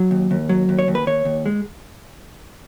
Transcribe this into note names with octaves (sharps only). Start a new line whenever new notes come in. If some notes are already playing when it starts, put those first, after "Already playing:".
Already playing: F#3
D#2
D#2
F#3
D#2
C#5
D#2
B4
D#2 C#5
D#2
G#3